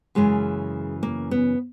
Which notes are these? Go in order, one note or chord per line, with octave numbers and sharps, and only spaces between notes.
F#2 C#3 E3 G#3
A#3
B3